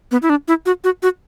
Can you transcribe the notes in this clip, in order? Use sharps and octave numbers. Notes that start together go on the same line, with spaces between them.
B3
E4
D4
E4
F#4
F#4
F#4